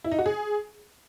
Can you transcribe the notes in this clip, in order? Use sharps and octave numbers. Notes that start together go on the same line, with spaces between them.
E4
D#4
F#4
G#4